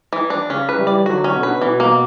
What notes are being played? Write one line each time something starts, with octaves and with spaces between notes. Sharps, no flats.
E3
D4
C#3 C#4
B4
E3 G3
D5
D3 F#3 F#4
C#4
B2 D3
B4
B2 E3
A#3